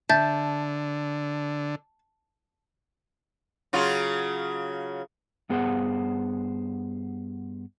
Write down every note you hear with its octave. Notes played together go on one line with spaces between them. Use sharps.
D3 E5 A5 G6 A6
C#3 F#3 F4
G2 B3 G#4 C5 F#5